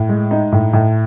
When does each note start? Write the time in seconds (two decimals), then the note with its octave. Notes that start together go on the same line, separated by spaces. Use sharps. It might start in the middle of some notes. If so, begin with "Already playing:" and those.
Already playing: A2
0.09 G#3
0.31 D#4
0.52 A2
0.73 A2